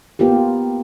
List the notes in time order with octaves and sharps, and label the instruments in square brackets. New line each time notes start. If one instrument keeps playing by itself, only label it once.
[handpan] A#3 B3 F4 G4